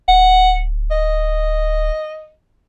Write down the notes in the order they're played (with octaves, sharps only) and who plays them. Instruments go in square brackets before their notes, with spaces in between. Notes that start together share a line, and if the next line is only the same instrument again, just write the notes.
[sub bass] D1 [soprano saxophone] F#5
[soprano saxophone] D#5